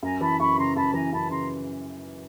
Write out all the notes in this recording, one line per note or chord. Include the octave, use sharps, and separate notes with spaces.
F#2 G#5 A#5
E3 A5 B5
F#2 B5 C#6
C#3 A#5 C6
F#2 A5 B5
E3 G#5 A#5
F#2 A5 B5
C#3 A#5 C6